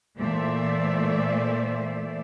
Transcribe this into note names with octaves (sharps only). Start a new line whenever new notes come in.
A#2 E3 A3 C5 D5 E5